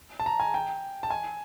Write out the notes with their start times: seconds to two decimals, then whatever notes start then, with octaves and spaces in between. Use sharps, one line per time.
0.20 A5
0.26 A#5
0.40 G#5
0.54 G5
1.03 A5
1.10 G#5